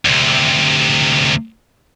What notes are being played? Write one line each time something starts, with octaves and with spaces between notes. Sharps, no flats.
D2 C3